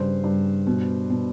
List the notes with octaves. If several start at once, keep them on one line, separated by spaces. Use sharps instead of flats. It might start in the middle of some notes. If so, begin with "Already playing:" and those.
Already playing: G2 C#3 C5
G2
B2
B2